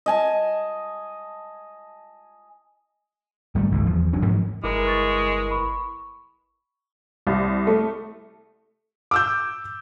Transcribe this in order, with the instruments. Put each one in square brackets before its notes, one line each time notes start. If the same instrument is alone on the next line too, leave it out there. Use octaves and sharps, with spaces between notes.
[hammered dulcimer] D#5 G#5 A5
[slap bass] G#1 G3 A3 A#3
G1 C#2 G#2
E2 F3
G1 F#3 C#4 D4
G#2 F3 F#3 A#3
[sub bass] G1 [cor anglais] G#3 [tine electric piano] E4 A#4 B4 [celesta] D6
[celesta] C#6 A6
B5 C#6
[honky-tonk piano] C2
A3
[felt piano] D6 E6 G6